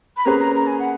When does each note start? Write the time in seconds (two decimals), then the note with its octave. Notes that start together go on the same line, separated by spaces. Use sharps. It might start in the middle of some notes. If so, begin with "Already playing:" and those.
0.17 B5
0.25 A#3 C#4 G#4 B4 A#5
0.40 A#5
0.55 A#5
0.67 G#5
0.79 F#5